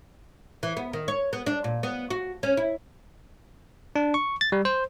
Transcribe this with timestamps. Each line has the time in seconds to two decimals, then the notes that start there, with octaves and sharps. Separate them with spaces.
0.63 E3
0.77 B3
0.93 D#3
1.08 C#5
1.33 B3
1.46 D4
1.64 A#2
1.83 B3
2.10 F#4
2.43 C#4
2.57 E4
3.96 D4
4.14 C#6
4.41 A6
4.52 G3
4.65 C5